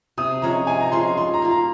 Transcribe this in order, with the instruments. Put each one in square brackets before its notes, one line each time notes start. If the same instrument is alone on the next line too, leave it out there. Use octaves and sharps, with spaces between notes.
[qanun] C3 [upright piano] D#6
[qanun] F3 G#3 C#4 [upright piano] A#5
[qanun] C3 [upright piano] G#5
[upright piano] A#5
[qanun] F3 G#3 C#4 [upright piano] C6
[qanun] G3 [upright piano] C6
[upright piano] A#5
[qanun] A#3 F4
[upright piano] A#5